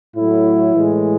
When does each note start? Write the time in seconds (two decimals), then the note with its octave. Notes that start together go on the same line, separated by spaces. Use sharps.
0.15 A2 F#3 A3 E4
0.75 A2 E3 G#3